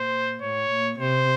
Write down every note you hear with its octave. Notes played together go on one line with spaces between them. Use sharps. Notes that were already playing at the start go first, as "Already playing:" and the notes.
Already playing: A#2 C5
A2 C#5
A#2
C3 C5